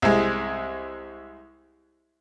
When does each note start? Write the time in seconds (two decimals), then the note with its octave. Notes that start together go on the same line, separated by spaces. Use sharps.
0.02 C2 G#3